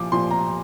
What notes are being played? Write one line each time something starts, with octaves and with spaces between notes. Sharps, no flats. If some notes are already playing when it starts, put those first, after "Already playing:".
Already playing: A#2 F3 D6
A#2 F3 C6
A#5